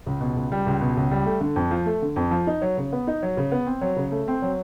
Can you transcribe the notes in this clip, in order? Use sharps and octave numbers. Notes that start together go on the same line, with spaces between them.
C#2
B2
C#2
G3
C#2
B2
C#2
G3
A3
D3
F2
F3
A3
D3
F2
F3
D#4
F#3
C#3
B3
D#4
F#3
C#3
B3
C4
F#3
C#3
A3
C4
F#3